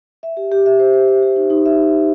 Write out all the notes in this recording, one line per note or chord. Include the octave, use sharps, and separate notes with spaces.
E5
G4
G4
E5
C5
C5
E5
G4
D#4
D#4
E5